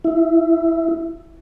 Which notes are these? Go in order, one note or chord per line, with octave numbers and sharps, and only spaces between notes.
E4